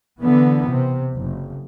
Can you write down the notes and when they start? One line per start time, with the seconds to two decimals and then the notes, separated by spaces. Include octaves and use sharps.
0.22 D3 E3 B3
0.67 C3
1.17 F#1